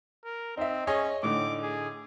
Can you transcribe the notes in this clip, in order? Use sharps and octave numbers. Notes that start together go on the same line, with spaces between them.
A#4
C4 D#4 E5
C#4 G#4 C#5 D#5
A2 D3 D#4 D6
G#4